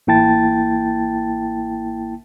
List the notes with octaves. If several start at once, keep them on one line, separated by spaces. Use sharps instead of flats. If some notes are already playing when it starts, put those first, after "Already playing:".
A1 A#3 E4 G5 A5 A6